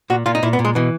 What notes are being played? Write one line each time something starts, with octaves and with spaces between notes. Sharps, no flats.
A#2 F#4
A#2 F4
D#4
A#2 E4
B3
A#2
G#3
B2 E3